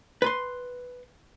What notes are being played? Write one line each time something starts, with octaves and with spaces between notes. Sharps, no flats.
B4 B5 C6